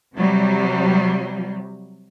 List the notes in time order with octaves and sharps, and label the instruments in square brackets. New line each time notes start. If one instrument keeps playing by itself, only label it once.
[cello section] C3 F#3 G3